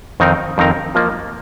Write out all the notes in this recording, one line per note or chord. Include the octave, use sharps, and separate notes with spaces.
F2 D#3 C4 D#4 A#4
F2 D#3 C4 D#4 A#4
F3 A#3 F4 A#4 D#5